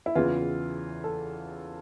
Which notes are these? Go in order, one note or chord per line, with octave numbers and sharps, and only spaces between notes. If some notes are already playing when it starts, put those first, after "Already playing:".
E4
E2 C#3 E3 F4
A4